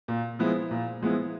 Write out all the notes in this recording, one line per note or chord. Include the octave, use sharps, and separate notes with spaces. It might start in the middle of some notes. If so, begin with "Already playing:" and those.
A#2
F3 G#3 B3 E4
A#2
F3 G#3 B3 E4